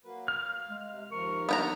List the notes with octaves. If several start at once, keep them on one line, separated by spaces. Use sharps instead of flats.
F#3 A#3 B4
F5 F6
G#3
C3
D#2 F3 A#4 C#6
B3 D4 G5 A#5